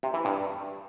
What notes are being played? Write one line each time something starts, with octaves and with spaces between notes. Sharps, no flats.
C3
E3
G2